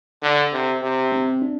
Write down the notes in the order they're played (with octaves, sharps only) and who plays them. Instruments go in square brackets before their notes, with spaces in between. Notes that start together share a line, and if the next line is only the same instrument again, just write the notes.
[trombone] D3
C3
C3
[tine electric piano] C4
D4